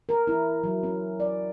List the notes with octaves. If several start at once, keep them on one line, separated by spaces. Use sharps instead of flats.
A#4
E4
F#3
C#4
D5